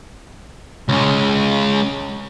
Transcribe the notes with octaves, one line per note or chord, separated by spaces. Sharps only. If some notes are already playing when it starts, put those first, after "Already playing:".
C#2 C#3